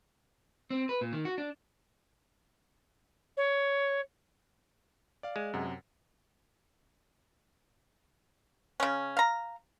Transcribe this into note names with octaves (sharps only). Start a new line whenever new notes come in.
C4
B4
A#2
D#3
F#4
D4
C#5
D5 F5
G#3
F#2 C3 F#5
C#3 C#4
F5 A#5